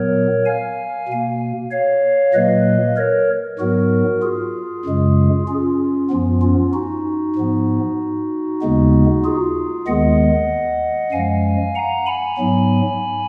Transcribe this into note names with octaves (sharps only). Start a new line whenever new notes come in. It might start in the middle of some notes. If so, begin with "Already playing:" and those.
Already playing: A#2 F#3 B3 A#4 C#5
F5 G#5
B2 A#3
C#5 F5
A#2 F#3 A#3 B4 D#5
A#4 C#5
G#2 F#3 B3 F#4 A#4
F4 G#4
F#2 C#3 G#3
C#4 F4
F#2 F3 B3
C#4 F4
D#4 F#4
G#2 F3 B3
D#2 C#3 G#3 B3
F4 G#4
D#2 D#3 G#3 B3 D#5 F#5
F#2 F3 G#3 F5 G#5
F#5 A#5
G#5 B5
G#2 F#3 B3